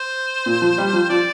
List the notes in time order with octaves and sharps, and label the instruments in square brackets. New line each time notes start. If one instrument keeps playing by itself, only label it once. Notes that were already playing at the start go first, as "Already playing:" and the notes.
Already playing: [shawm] C5
[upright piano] A#2
F3
G3
F3
[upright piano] F3 [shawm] D5